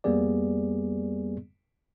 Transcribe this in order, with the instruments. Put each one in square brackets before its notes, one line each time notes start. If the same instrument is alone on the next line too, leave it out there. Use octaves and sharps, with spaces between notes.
[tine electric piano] F2 G3 A#3 B3 G#4 D5